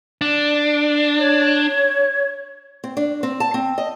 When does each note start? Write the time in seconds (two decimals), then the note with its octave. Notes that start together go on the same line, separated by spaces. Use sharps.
0.21 D4
1.19 C#5
2.84 C4
2.97 D4
3.23 C4
3.40 A5
3.54 C4
3.78 D#5